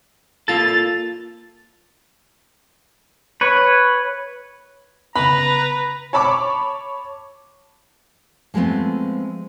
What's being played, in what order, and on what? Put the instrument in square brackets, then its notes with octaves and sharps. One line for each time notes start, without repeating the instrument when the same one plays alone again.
[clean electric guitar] A#3 F4 A4 [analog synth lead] A6
[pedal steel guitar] B4 C#5
[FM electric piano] C#3 B3 [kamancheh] B4 [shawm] A#5 [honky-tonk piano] B5
[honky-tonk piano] C#5 A5 B5 C#6 D6
[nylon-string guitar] F3 G#3 A3 B3 C4